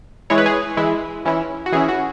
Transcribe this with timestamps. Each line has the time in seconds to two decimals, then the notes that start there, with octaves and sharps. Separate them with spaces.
0.30 E3 G#3 E4 C#5
0.38 B4
0.46 G#4
0.77 E3 G#3 E4
1.25 E3 C#4 E4
1.66 F#4
1.72 E3 C#4 E4 G#4
1.88 F#4